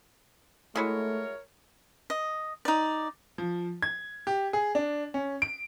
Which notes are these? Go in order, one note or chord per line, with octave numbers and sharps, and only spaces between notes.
G#3 A3 E4 F#4 A#4 C#5
D#5
D#4 D5
F3
G#6
G4
G#4
D4
C#4
D7